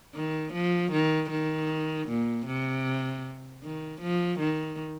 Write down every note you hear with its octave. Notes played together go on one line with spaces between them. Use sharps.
D#3
F3
D#3
D#3
A#2
C3
D#3
F3
D#3